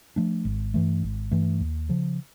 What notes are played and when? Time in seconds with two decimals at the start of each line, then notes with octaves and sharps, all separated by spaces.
0.16 F3 A3 D4
0.45 G#1
0.74 G2 E3 A3
1.03 G#1
1.32 G2 E3 A3
1.60 D#2
1.89 C#3 F3